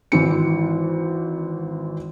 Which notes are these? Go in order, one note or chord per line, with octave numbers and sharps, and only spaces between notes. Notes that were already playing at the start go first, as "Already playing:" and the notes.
G#1 E3 C4 C#7